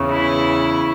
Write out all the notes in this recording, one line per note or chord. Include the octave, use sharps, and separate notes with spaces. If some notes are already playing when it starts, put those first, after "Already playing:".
Already playing: E2 C#3 E3
E4